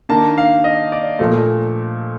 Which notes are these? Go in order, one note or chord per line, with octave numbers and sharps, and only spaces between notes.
D#3 A#3 D4 A5
F5
D#5
D5
A#2 F3 A3